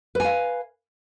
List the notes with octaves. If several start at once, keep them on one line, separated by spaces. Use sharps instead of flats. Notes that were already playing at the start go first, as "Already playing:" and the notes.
B4 F5 G#5